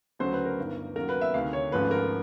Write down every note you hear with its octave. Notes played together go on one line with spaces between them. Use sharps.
D2 C#3 F#3 A3 C#4 C5
B4
A#4
G1 G2 D#3
D#2 C#3 F#3 A#4
B4
E5
D2 C3 D#3 F5
C#5
G#1 G#2 F3 A3 C#4 B4
A#4